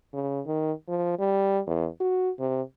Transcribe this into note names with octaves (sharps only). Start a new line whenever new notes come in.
C#3
D#3
F3
G3
E2
F#4
C3